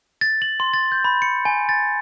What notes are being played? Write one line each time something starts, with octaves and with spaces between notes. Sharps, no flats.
A6
F#7
C6
A6
G6
B5
C#7
G#5
A6